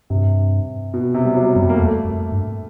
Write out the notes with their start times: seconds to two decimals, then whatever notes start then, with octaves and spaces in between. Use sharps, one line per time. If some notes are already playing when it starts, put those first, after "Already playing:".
0.10 G2 C3
0.94 B2
1.14 C3
1.25 G3
1.35 F#3
1.56 F#2 G3
1.67 F2 A#3
1.76 E2 A3
2.05 F2
2.32 G2